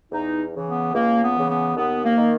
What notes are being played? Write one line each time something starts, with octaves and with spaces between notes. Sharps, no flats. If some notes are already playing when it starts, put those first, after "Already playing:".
E2 D#4
C#3 E3
B3
C#2 A#3
B3
C#3 E3
B3
D#2 B3
A#3
D#3